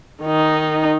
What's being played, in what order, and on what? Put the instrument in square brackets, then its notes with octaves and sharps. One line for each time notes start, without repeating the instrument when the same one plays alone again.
[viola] D#3 D#4